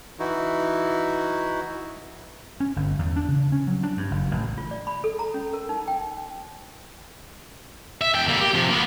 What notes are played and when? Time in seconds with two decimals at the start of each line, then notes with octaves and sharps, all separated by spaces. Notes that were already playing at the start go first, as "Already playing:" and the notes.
0.19 E3 D#4 E4 F#4
2.60 C#4
2.76 G1
2.99 E2
3.16 D4
3.28 C#3
3.52 C#4
3.67 F#3
3.83 D4
3.97 G2
4.11 F#1
4.31 A1
4.58 F4
4.71 D5
4.87 B5
5.04 A4
5.19 A#5
5.34 C#4
5.53 A#4
5.69 D#4
5.88 G5
8.01 E5
8.14 E2 G5
8.28 G3 A#3
8.40 G4
8.54 C3 F3
8.70 A#3 B3